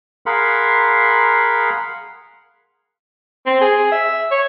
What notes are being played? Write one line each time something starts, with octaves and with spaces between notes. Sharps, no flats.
G#4 A#4 F5 F#5 B5 C6
C4
G#4
E5
C#5